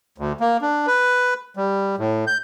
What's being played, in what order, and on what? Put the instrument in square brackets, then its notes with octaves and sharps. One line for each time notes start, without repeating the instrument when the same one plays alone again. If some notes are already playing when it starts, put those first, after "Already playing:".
[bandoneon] D2
A#3
D4
B4
G3
A2
G6